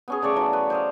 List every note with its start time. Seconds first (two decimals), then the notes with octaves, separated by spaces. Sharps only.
0.08 B3 C#4 G#4
0.22 C#3 A3 D5 C#6
0.36 E3 F#3
0.53 B4
0.70 C5 D#5 F5